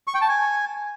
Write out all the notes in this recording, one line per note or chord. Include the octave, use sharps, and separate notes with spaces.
C#6
G5
A5
G#5